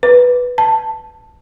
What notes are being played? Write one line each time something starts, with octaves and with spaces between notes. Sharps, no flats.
B4
A5